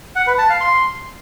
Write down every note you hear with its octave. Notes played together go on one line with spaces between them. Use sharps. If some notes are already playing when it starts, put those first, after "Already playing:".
F#5
B4
A5
F5
C6